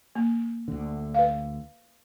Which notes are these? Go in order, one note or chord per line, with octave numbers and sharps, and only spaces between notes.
A#3
D2 D3
B4 F5